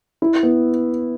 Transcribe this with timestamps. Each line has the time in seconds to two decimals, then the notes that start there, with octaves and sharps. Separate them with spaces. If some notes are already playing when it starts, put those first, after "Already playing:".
0.22 E4
0.43 B3